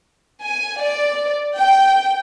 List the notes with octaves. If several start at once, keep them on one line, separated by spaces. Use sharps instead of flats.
G#5
D5
G5